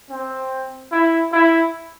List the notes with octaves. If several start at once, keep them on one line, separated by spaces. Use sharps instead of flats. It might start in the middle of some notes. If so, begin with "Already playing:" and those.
C4
E4
E4